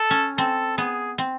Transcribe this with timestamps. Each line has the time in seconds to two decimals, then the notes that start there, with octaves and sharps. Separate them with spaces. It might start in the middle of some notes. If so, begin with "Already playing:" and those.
Already playing: A4
0.11 C#4
0.38 C4 A4
0.77 B3 G#4
1.18 C4